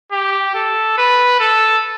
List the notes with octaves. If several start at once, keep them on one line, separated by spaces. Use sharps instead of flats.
G4
A4
B4
A4